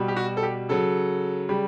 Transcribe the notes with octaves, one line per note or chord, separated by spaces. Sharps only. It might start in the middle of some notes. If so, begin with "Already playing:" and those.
Already playing: B2 G3
G4
F#4
A4
G4
C#3 F#3 A4
C#3 G3